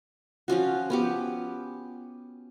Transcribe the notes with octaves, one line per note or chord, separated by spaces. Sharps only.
F3 C#4 F4 F#4
B3 C#4 G4